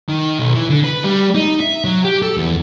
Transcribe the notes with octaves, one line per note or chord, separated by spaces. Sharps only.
D#3
B1
E3
D3
B4
G3
D#4
E5
F#3
G4
A4
E2